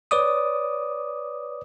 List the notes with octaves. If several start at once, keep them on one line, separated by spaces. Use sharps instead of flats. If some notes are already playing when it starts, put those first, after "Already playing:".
B4 C#5 D5 D6 D#6